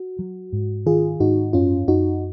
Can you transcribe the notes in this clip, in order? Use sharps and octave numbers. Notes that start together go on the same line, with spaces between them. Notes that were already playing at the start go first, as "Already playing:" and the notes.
Already playing: F#4
F#3
G#2
D#3 F4 G#4
G#2 D#4 F#4
F#2 C#4 F4
F#2 D#4 F#4